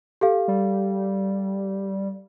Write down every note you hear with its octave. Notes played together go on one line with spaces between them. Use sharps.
G4 A4 F5
G3